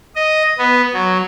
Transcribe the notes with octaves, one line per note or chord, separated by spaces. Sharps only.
D#5
B3
F#3